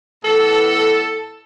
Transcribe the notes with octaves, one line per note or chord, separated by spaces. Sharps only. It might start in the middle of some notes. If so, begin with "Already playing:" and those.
A2 E3 B3 A4